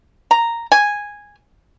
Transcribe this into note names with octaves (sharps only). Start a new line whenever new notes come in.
A#5
G#5